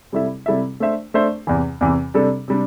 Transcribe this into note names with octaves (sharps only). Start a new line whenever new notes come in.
C3 G3 E4 A4 E5
C3 G3 E4 A4 E5
A3 D4 C5 E5
A3 D4 C5 E5
E2 C3 E3
E2 C3 E3
C3 G3 D4 A4
C3 G3 D4